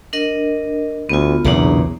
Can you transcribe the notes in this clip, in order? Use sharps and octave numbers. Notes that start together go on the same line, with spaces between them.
D4 A#4 D#5
D2 B3 F4
B1 E2 A#2 C#3 D4 A#5